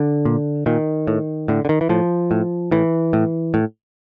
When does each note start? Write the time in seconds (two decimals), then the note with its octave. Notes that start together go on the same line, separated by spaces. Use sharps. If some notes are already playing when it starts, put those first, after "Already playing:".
Already playing: D3
0.25 A#2
0.66 A#2 D#3
1.07 A2
1.48 A2 D3
1.65 D3
1.69 D#3
1.81 E3
1.89 A2 F3
2.31 A2
2.71 A2 E3
3.13 A2
3.54 A2